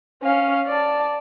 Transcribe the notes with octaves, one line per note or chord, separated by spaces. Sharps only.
C#4 F5
D5 A5